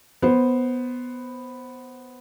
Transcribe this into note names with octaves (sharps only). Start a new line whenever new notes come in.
B3 C5